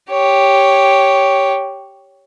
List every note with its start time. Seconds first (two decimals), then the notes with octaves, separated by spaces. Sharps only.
0.10 G4 C#5